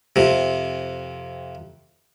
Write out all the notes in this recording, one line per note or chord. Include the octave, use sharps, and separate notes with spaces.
F2 C3